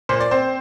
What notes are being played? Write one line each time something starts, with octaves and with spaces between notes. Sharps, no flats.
A#2 C5
D5
C4 C5